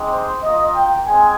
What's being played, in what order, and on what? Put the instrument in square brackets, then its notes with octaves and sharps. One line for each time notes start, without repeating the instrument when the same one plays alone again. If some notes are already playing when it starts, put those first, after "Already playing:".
Already playing: [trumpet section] G#3 C4 D#4 G4
C5
A#3 F4 D#5
G5
G#3 C4 G#5